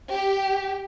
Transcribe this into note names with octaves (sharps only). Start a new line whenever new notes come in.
G4